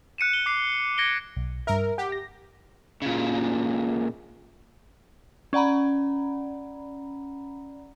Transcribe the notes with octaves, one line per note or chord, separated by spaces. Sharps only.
F#6 C#7 D#7 E7
G7
D6 C7
G#6 A#6 C#7 D7 G7
B1
G2 A#4 E5
G4 F#5
A#6
A#2 C#3
C#4 D5 F#5 A#5 B5